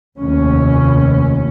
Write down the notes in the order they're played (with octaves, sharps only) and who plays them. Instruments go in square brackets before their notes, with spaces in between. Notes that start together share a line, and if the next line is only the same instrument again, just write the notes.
[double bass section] F1 D#2 C#4